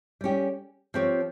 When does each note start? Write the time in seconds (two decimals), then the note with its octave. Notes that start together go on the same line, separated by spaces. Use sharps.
0.21 G3 C#4 G4
0.94 F3 C4 G4 C#5